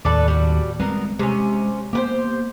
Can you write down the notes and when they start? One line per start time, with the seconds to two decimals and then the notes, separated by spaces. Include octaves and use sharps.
0.05 D#2 A2 A4 B4 D5
0.28 G3 F#4
0.80 G3 G#3 B3 C4 A#4
1.19 C3 G#3 C#4
1.93 A#3 B3 G4 B4 C5